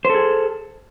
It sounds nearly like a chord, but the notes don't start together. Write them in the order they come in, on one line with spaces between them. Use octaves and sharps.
C5 A4 G#4